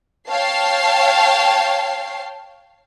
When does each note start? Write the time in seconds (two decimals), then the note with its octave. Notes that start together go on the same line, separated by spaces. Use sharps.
0.30 C#5 F5 G5 A5 C7